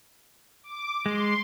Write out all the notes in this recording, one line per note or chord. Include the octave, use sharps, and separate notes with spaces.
D6
G#3 C6